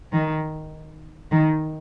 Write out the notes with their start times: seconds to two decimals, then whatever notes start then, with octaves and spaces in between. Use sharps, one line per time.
0.12 D#3
1.31 D#3